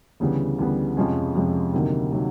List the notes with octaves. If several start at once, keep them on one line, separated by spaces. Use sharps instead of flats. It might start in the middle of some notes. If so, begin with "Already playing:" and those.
D2 C#3 E3 G3 B3
D2 C#3 E3 G3 B3
F2 C3 F3 G#3 C#4
F2 C3 F3 G#3 C#4
D2 C3 D#3 F#3 A#3
C3 D#3 F#3 A#3